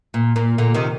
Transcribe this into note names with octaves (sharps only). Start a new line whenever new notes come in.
A#2
A#2
A#2 D3
C3 D#3